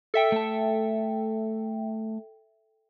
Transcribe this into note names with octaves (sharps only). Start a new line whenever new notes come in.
A4 E5 G5
A3 A5